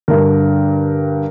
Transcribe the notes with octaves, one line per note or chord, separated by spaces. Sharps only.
G2 D3 A#4